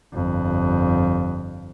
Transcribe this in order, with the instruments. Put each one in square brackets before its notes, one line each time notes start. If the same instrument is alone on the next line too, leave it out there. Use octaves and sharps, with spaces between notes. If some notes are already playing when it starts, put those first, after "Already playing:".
[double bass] G1 F2